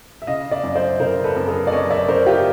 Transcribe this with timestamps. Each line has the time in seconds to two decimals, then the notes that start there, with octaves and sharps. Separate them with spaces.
0.22 E5
0.27 C#3 D#5 F5
0.51 D5 E5
0.63 F#2
0.76 C5 D5
1.00 C#3 A#4 C5
1.24 A4 B4
1.36 F#2
1.48 G#4 A#4
1.67 D5
1.72 F#2 C#5 D#5
1.91 D5 E5
2.08 C#3 A#4 C5
2.26 F4 G4